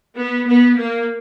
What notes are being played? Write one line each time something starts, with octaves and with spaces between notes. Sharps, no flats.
B3
B3
A#3